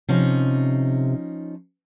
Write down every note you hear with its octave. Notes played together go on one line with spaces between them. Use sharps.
C3 F3 C#4 D#4